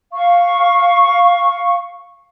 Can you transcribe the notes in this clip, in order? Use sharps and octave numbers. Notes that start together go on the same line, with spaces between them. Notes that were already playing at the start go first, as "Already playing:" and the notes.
F5 C#6